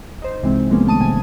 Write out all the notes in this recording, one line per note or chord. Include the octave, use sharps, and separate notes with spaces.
D#4 C5
C2 C3 E3 G#3 C4
E3 F3 G#3 A#3 B3 C#4
D#3 A3 A5 D#6 D#7
G1 C3 F3 G#5 A5